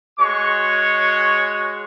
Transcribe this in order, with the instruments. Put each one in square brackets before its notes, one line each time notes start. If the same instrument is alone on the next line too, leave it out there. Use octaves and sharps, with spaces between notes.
[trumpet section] G#3 F#4 C#5 C#6